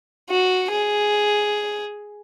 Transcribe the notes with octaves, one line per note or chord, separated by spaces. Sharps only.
F#4
G#4